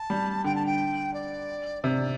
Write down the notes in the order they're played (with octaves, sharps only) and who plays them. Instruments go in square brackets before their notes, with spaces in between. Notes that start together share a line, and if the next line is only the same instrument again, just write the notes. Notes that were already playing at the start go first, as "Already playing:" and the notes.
Already playing: [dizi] A5
[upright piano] G3
[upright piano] D3 [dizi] G5
[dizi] A5
G5
D5
[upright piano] C3 [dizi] D5